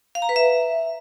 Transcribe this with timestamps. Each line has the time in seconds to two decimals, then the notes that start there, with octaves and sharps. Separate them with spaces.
0.15 F5
0.22 A#5
0.29 B4
0.36 E5